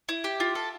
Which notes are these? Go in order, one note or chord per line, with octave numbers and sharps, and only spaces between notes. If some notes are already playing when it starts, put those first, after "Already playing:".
E4
G4
F4
A4